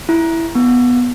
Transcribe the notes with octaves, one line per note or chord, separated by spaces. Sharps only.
E4
B3